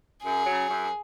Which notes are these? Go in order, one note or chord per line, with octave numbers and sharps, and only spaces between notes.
F#2 G#4
C#3 F#3
F#2